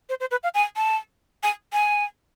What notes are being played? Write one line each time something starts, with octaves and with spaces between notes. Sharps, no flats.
C5
C5
B4
F5
G#5
A5
G#5
G#5